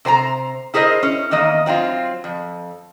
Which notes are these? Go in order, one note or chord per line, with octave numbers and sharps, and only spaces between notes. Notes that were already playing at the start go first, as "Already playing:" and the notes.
C3 C5 G#5 A#5
E4 G#4 A#4 C5 D#5
C#4
E2 D#3 A#3 D#5
F#3 C4 D4 F4
F2